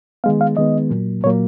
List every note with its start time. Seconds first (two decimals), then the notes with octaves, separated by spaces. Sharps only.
0.24 D#3 G#3 B3 F5
0.41 F5
0.57 D#3 G#3 B3 D#5
0.90 A#2 F#3 A#3
1.24 A#2 F#3 A#3 C#5